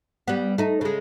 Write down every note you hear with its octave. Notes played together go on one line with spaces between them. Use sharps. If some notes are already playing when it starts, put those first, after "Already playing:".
G3 B3
A3 D#4
C#3 G#3